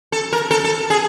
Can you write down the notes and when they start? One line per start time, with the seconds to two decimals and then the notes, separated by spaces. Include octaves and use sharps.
0.12 A4
0.33 A#4
0.51 A4
0.64 A4
0.90 G#4